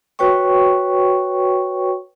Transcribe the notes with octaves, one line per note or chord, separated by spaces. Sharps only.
F#4 B4 C#5 G5 C#6